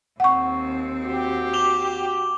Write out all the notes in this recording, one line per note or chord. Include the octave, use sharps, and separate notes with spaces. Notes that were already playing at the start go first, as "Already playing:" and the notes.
D#2 C4 F#5 C#6
F#4 G4
D6 F7 G7